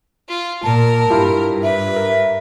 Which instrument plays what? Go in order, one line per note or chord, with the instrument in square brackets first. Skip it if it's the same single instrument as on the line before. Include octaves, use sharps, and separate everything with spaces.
[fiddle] F4
[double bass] A#2 [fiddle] A#4 [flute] A5
[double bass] G2 [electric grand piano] E4 F4 G4
[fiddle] B4 [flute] E5
[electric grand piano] A#4